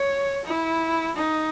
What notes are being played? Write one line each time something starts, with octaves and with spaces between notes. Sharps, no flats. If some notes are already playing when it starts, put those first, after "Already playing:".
Already playing: C#5
E4
D#4